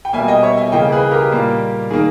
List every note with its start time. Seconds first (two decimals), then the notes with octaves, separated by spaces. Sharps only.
0.05 G5
0.13 B2 G3 A#3 E5 G#5
0.28 D#5 G5
0.43 C#5 E5
0.57 E5 G#5
0.72 C#3 E3 A#3 D#5 G5
0.92 G#4 B4
1.11 G4 A#4
1.32 A#2 G3 A#3
1.90 D#3 A#3 G#4